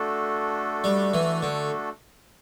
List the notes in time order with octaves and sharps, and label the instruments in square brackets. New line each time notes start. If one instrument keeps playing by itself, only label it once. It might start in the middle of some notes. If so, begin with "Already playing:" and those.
Already playing: [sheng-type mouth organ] A3 D4 F#4 A4
[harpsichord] G3
E3
D3